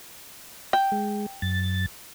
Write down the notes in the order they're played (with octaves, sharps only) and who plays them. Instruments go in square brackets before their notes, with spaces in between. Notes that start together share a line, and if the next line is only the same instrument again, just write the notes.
[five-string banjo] G5
[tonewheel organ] G#3
F#2 A6